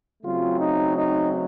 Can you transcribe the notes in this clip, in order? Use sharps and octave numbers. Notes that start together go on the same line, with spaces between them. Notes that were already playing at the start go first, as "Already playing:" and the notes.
C#3 F#3 A3 C4 F4
D#4
D#4